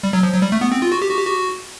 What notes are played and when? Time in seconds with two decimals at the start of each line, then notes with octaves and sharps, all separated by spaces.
0.03 G3
0.13 F#3
0.23 F3
0.33 F#3
0.42 G3
0.52 A3
0.61 B3
0.72 C4
0.82 F4
0.92 F#4
1.02 G4
1.11 F#4
1.17 G4
1.26 F#4